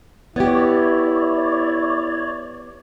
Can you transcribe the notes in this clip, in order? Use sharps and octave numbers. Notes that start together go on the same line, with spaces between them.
B3 E4 G4 C#5 D5